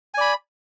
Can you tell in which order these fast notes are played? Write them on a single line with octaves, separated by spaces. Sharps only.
G#5 D5 B5